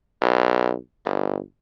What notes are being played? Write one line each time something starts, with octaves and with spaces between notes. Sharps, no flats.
B1
G1